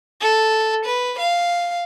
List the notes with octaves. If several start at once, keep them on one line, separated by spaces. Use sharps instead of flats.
A4
B4
F5